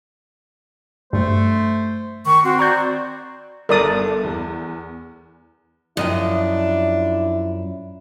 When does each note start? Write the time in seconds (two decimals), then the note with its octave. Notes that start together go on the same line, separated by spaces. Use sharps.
1.13 G2 A3 C5
2.26 D#3 C#6
2.44 C4 F#4 C6
2.59 F#4 D5 A#5 C#6 G6
3.69 G1 A4 A#4 D5 D#6
4.24 E2
5.97 F#2 F3 D4 E4 D#5 G5